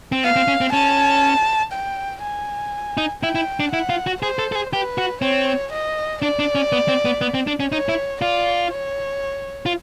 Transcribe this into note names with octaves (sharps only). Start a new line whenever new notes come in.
C4
B3 F5
C4
C#4
C4
C#4 A5
G5
G#5
D#4
E4 G5
E4
D4
E4 F#5
F4
F#4
G#4 C5
A4
A4
G#4
G4 B4
F#4
C4 C#5
D#5
D4 D5
D4
C#4
B3
C4
B3
B3
C4
D4
C#4
D#4 C#5
E4
F4 D5
C#5
F4